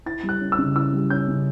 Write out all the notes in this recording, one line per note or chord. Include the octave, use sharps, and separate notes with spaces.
E4 A6
G3
F#6
C#4
E6
C#3
E4 E6
G3
C#4 G6
C#3